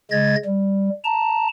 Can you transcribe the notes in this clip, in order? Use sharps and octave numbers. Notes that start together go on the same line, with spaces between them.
C#3 G#3 D#5 G#6 A6
G3
A5 A#5